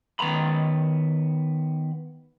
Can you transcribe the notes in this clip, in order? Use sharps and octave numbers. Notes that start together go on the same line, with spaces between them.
D#3 B3 A#5 B5